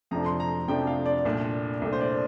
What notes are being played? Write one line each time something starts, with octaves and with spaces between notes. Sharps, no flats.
F2 C3 F3 A3 D4 A#5
C6
A#5
F2 C3 F3 A3 D4 G5
F5
D5
C2 A#2 A3 D4
C2 A#2 A3 D4
C5
D5